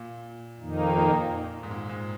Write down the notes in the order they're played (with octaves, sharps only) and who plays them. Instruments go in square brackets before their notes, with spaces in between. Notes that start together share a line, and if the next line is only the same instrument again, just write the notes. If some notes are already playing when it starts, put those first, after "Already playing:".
Already playing: [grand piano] A#2
[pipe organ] F2 D#3 A#3 D#4
[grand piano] A#2
G#2
A#2
G#2